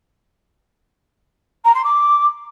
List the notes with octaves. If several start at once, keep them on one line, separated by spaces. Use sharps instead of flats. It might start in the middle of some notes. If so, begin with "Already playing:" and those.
A#5
C6
D6